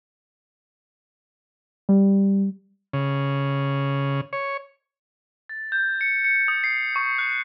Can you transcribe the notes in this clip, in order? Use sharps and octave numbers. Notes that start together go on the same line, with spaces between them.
G3
C#3
C#5
A6
G6
C#7
C#7
D#6
C7
C#6
F#6